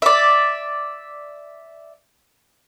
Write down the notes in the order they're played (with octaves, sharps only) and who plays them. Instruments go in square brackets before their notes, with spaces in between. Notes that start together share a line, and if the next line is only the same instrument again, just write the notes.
[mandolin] D5 E5